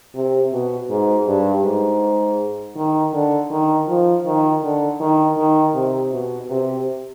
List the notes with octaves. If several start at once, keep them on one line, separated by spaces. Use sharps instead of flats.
C3
B2
G#2
G2
G#2
D#3
D3
D#3
F3
D#3
D3
D#3
D#3
C3
B2
C3